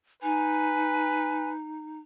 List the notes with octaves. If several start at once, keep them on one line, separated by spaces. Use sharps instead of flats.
D#4 B4 G#5